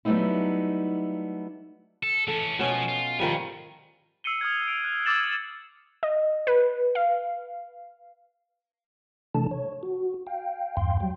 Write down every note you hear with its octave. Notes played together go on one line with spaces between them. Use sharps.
F#3 G3 A3 B3 D#4 E4
A4
E3 C#4 A4
B2 F3 C#4
F4
D#3 F3 G3 D5 G#5
E6 C7 C#7 D#7 G7
D#6 F6 G#6
D7
F#6
D6 E6 G#6 A6 E7 F#7
D#5
B4
F5
C3 E3 A3 D4 A4 A5
C#5
F#4
F5 G5
E2 G2 F5 G5 C6
F#3 G3 G5